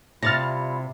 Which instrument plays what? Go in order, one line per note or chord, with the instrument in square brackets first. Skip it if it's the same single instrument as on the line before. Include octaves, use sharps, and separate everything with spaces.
[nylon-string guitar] C3 [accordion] G3 E4 F4 [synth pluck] F6 A6 A#6